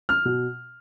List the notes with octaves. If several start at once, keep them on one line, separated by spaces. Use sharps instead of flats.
F6
B2